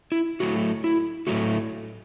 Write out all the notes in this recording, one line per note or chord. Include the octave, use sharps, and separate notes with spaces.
E4
A2 F#3 A3 F#4
E4
A2 F#3 A3 F#4